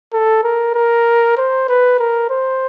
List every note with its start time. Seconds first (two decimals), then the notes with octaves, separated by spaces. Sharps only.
0.13 A4
0.44 A#4
0.74 A#4
1.38 C5
1.69 B4
1.99 A#4
2.30 C5